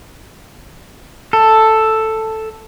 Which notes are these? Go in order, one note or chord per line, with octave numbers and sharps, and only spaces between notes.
A4